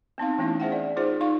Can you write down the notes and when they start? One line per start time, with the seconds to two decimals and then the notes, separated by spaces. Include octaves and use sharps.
0.18 B3 C4 D#4 F5
0.38 E3 A3 B3 C#4 E4
0.60 G#4 C5 E5 F#5 G5
0.72 D5
0.96 D#4 F4 G#4 C5
1.21 D#4 F5 C#6